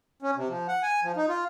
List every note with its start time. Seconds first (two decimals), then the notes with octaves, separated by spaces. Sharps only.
0.22 C#4
0.36 C3
0.49 F3
0.68 F#5
0.83 G#5
1.03 F3
1.16 D#4
1.29 F4